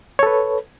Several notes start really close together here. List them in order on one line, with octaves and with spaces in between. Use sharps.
C#5 A4 B4